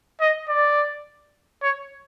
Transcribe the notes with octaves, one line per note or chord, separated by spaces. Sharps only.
D#5
D5
C#5